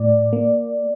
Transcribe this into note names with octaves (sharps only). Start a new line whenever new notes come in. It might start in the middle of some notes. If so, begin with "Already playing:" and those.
Already playing: A2 D5
A#3